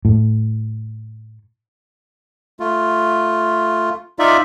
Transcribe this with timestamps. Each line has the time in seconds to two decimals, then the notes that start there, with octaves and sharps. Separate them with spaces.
0.05 A2
2.60 A3 F4
4.19 D#4 F4 D5 E5